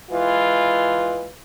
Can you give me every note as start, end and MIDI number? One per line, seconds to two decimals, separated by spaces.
0.11 1.30 52
0.11 1.30 56
0.11 1.30 65
0.11 1.30 71